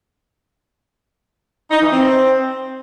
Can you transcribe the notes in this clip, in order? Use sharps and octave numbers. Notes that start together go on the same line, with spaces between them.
D#4
E3
C4